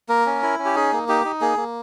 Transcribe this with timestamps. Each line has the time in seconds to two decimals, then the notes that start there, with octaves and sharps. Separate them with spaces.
0.09 A#3 A#4
0.26 C#4
0.43 E4
0.59 C#4
0.65 G4
0.75 D#4 G#4
0.93 A#3
1.08 D#4 G4
1.25 D#4
1.41 A#3 G#4
1.57 A#3